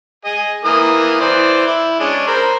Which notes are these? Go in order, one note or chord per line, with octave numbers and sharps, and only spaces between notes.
G#4 D#5
E3 A#3 D#6
E3 C5 D5
E4
G#3 C#4 D4
A#4 C5 B5